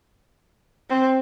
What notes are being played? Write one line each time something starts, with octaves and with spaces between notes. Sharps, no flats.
C4